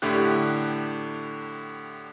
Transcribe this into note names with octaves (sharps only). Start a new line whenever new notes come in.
A2 D3 E4 G4 F#6